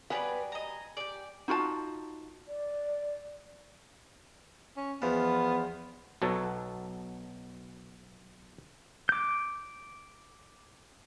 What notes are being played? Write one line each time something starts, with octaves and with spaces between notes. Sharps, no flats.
F#3 G3 B3 B4 D5 G#5
D#5 A#5
G4 G#4 D5
D#4 F4 F#4 A5
D5
C#4
E2 F3 B3
B1 B2 F#3 A4 C#5
D6 G6